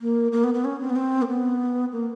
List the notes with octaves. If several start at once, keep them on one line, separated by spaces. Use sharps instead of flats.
A#3
A#3
B3
B3
C#4
C4
B3
C4
A#3
B3
A#3